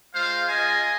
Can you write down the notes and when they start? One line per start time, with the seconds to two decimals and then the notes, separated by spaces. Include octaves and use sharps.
0.14 G#3 F4 C5 F5
0.48 G#3 F4 D#5 G#5